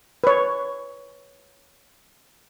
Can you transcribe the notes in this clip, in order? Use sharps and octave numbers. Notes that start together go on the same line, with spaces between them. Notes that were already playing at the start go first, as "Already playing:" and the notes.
B4 C#5